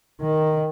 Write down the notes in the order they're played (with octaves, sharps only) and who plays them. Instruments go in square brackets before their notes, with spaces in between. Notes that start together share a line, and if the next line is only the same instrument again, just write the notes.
[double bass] D#3